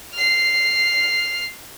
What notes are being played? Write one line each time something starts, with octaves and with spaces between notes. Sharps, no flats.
F6 C7